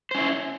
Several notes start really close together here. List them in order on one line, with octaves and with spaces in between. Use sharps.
C5 C#4 E4